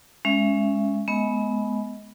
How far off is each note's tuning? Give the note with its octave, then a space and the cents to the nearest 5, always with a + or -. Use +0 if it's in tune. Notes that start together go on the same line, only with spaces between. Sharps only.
G#3 +0 C#4 +0 E5 +30
G#3 +25 B3 +0 D#5 +25